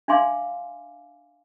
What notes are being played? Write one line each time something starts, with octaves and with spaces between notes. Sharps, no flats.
D4 E5 F5 G#5 C6 D6